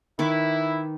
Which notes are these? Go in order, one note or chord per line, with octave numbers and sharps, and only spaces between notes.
D#3 E4 B4 D6